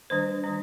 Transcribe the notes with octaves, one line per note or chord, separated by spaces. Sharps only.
D#3 G3 D4 C5
D#3 G3 D4